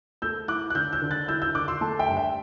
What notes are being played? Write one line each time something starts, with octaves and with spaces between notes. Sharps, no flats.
A3 E6 G6
E4 D6 F#6
F#6
D3 E6 G6
E6 G6
D3
F#6 A6
E4 E6 G6
E6 G6
D3 D6 F#6
C6 E6
A3 A5 C6
E5 G5
G2
E5 G5